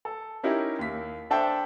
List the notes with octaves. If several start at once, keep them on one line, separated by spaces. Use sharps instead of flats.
A4
C#4 D#4 E4 G4 A#4
D#2 B6
D4 A4 C5 E5 G5 A5